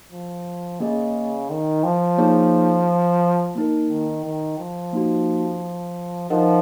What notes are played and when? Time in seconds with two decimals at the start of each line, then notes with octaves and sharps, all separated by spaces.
0.12 F3
0.80 C#3 A#3 C#4 G#4 D#5
1.50 D#3
1.84 F3
2.18 A#3 D#4 G#4 C#5
3.55 A#3 D#4 A#4
3.90 D#3
4.24 D#3
4.58 F3
4.93 A#3 D#4 F#4
6.30 F3 D#4 A#4 D#5 F#5